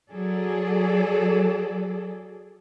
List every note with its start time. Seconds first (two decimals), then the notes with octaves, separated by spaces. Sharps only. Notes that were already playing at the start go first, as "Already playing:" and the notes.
0.10 F#3 G#4 A4 D5